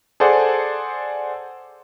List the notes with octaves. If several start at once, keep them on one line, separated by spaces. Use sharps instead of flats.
G#4 A4 C5 D5 F#5